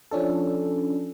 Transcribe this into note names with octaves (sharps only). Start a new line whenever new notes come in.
F3 C#4 D4 A4